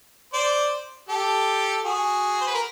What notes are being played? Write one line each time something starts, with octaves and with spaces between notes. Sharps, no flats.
C5 D5
G4 A4
F#4 G#4
C5
B4
A#4